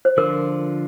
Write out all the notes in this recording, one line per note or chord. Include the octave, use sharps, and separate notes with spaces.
C5
D3 F3 D4 F4 A#4